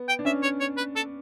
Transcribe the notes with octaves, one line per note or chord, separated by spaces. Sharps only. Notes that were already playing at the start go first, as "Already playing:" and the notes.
Already playing: B3
G5
D4
C#4 E5
C#5
C#5
B4
A4